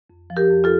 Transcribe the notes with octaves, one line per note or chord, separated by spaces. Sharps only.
F2
F3
G4 A#4
F2
F4 A4